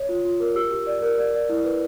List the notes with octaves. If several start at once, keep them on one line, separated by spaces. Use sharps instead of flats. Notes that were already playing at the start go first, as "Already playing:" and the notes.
Already playing: C#5
F4
F4
A#4
G4 E6
G4
D5
A#4
D5
D5
E4
B4